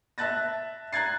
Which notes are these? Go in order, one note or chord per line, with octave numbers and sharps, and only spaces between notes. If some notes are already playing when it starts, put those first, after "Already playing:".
E5 A5 F#6 A6 A#6
A#5 F#6 G#6 A6 C7